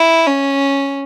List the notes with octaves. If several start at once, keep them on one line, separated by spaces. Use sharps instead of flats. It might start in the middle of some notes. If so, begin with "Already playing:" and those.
Already playing: E4
C#4